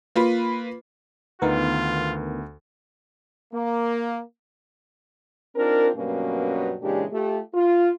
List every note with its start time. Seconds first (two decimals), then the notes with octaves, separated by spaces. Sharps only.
0.16 A#3 F4 B4
1.42 D2 D#3 B3 F4 A#4
3.52 A#3
5.56 C4 D4 D#4 F4 A#4
5.95 G2 B2 F#3 A#3 C#4
6.82 A#2 C#3 E3 G#3 D4 G4
7.12 A3 F4 G4
7.54 F4